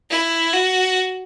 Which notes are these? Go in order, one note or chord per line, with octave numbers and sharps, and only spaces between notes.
E4
F#4